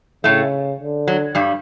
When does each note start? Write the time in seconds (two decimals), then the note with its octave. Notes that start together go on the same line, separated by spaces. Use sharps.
0.24 A2 C#3 A3
0.80 D3
1.08 F#3
1.35 G2 G3